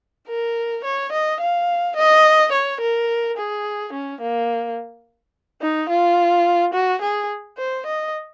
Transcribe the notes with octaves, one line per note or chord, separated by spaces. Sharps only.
A#4
C#5
D#5
F5
D#5
C#5
A#4
G#4
C#4
A#3
D#4
F4
F#4
G#4
C5
D#5